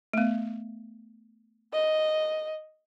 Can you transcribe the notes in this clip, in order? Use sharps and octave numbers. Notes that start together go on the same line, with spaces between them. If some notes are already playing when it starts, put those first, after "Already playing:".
A3 B3
D#5